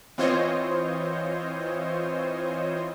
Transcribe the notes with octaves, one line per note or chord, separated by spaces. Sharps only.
E3 C4 F4 C5 C#5 D#5